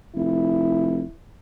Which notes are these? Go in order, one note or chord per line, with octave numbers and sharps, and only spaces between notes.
F1 E4